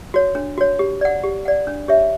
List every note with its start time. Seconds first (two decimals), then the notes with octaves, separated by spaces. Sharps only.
0.14 F#4 C#5
0.35 D4
0.58 F#4 C#5
0.79 G4
1.01 D5 F#5
1.23 G4
1.45 D5 F#5
1.67 D4
1.88 G4 C#5 E5